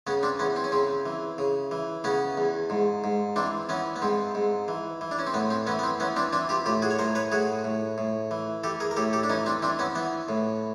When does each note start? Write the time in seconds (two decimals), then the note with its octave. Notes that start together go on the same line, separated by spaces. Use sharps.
0.07 C#3 B3 C#4
0.23 C4 D4
0.39 E2 B3 C#4
0.56 C4
0.64 C#4
0.72 C#3 C4
1.06 E3
1.38 C#3
1.71 E3
2.04 C#3 B3 C#4
2.37 E2
2.70 G#2
3.04 G#2
3.36 E3 C4 D4
3.69 E3 B3 C#4
3.96 B3
4.02 G#2 C4
4.35 G#2
4.68 E3
5.01 E3
5.11 D4
5.19 C#4
5.27 C4
5.34 A2 B3
5.50 C4
5.67 E3 B3 C#4
5.79 B3
5.83 C4
6.00 E3 B3 C#4
6.16 C4 D4
6.33 E3 C4 D4
6.49 F4 G4
6.66 A2 F4 G4
6.82 F#4 G#4
6.91 C#5
6.99 A2 A#4 C5
7.15 B4 C#5
7.32 A2 F#4 G#4
7.64 A2
7.98 A2
8.31 E3
8.64 E3 G4 A4
8.80 G#4 A#4
8.91 A#4
8.97 A2 G4 A4
9.13 G4 A4
9.23 D4
9.30 E3 C#4 D#4
9.46 C4 D4
9.62 E3 C4 D4
9.79 B3 C#4
9.95 E3 B3
10.29 A2